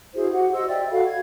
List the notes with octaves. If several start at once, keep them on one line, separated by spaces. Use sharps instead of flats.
E4 F#4 G#4 C5
F#4 G4 F#5
C5 D#5 E6
D5 E5 G5
F#4 A4 F5 B5
G#6